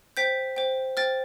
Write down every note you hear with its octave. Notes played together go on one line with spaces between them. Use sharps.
C5 G5 G6 B6
C5 G5
C5 G5 F6 A6